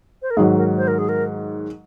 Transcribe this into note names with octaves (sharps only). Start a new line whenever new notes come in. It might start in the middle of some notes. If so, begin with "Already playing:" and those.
C5
A#4
G#2 D#3 F#3 G#4
A#4
C5
A#4
G#4
A#4